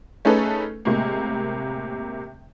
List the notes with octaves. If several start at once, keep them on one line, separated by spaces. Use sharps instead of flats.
A3 C#4 D#4 G#4 A4 B4
A2 C3 G#3 A#3